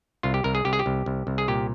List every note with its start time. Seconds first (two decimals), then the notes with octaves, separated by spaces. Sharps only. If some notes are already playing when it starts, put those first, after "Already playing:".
0.23 C2 F4
0.34 G4
0.44 C2 A#4
0.55 G#4
0.65 C2 G4
0.73 G#4
0.79 G4
0.86 C2
1.06 C2
1.27 C2
1.38 G#4
1.48 A#2 G4